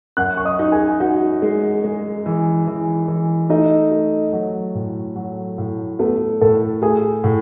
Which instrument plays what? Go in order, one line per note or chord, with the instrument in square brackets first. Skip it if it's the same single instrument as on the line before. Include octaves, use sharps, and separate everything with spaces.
[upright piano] F#2 [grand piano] F#5 F#6
[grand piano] C#6
D#5 D#6
[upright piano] D#4
[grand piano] G#4 G#5
[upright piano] D#4 [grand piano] F#4 F#5
[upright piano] G#3
G#3
E3
E3
E3
[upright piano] A3 [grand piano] D#4 D#5
[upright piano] A3
F#3
A2
F#3
A2
[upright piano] A3 [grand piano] B3 B4
[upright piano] A2 [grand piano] A4
[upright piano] A3 [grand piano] G#4
[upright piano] A2